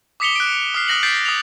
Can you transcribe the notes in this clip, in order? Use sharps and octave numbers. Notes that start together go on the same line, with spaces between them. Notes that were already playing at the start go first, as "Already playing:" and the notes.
D6 D#6 B6 C#7 F7 G7
F#6 D7
D#6 F6 C7
D#6 F#6 A#6 F#7
G6 A6 B6 C7 D7
D#6 F7